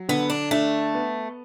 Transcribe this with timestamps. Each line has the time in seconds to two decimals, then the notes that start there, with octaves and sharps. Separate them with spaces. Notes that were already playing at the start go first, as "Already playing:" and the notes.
Already playing: F#3
0.09 D3 B3
0.30 D4
0.51 A3 D4
0.94 B3